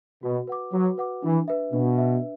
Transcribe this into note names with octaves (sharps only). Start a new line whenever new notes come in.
B2 F#4
B4 F#5 D6
F#3 F#4
B4 F#5 D6
E3 D4
B4 E5
B2 D4
B4 E5